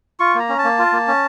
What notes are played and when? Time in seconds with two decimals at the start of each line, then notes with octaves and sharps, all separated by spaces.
0.20 F4 C#6
0.35 A#3 A#5
0.49 C#4
0.59 A5
0.64 A#3
0.79 F4
0.93 A#3
1.08 C#4